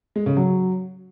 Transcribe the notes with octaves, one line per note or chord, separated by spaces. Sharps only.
G#3
C#3
F#3